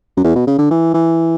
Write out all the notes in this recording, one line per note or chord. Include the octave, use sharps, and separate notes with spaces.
F#2
E2
B2
C#3
D3
E3
E3